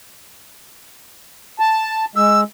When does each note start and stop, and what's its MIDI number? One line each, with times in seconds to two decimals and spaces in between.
1.59 2.05 81
2.16 2.43 56
2.16 2.40 88